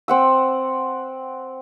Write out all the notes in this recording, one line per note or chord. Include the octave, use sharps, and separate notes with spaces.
C4 F#5 E6